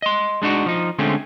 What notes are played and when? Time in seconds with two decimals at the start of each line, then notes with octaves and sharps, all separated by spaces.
0.02 D#5 C6
0.42 G#3 D4 D#4 F#4
0.66 F3 D#4
0.99 D3 G#3 A3 C4 C#4